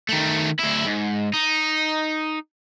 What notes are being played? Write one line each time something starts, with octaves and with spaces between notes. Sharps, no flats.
D#3 A3
D2 E4
G#2
D#4